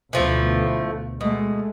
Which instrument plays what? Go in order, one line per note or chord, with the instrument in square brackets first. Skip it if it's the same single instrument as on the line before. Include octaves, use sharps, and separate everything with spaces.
[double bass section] D2 B2 [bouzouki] E3 F3 A3
[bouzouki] B2 [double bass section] G#3 A3